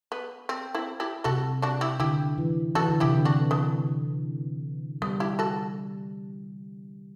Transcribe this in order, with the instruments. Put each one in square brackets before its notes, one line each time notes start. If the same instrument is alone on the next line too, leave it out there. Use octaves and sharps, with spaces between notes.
[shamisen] B3
C4
C4 E4
E4 G4
[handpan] C3 [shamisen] F#4 A4
[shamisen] D4 F#4
E4 G4
[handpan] D3 [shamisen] E4 G4
[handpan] E3
[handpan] E3 [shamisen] F#4 A4
[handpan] D3
[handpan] C3 [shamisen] E4 G4
[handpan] D3
[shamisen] D4 F#4
B3 D4
[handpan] G3 [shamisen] B3
[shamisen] E4 G4
F#4 A4